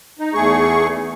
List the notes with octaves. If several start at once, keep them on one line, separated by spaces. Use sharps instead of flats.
D#4
E2 A3 G#4 C#6